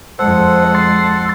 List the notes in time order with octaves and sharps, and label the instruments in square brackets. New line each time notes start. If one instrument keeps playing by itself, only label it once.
[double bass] F2 G#3 [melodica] A4 F#5 [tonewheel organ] C5
[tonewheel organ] A5 C6